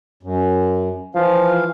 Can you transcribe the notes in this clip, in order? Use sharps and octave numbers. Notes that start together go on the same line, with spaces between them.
F#2
E3 F3 F5